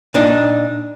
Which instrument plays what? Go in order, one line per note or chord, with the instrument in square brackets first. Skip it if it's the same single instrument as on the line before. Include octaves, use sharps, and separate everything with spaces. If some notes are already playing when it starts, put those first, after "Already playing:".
[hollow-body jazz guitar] A#2 D4 D#4